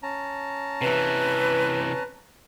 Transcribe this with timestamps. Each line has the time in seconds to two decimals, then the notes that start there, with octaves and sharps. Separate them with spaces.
0.03 C#4 A5 A#5
0.81 C3 E3 B4